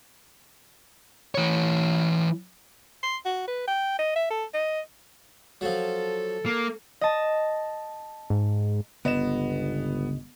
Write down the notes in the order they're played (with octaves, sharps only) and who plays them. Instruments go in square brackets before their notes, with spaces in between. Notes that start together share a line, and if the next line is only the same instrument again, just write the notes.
[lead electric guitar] E3 C#5
[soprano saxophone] C6
F#4
B4
G5
D#5
E5
A4
D#5
[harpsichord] F3 F#3 [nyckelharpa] A4
[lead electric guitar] A#3
[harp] D#5 A5
[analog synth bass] G#2
[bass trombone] G1 [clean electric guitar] C#2 D#5 [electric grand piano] B3 E7